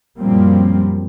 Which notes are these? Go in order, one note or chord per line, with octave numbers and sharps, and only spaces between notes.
F#2 A#2 F3 G3 A#3 C4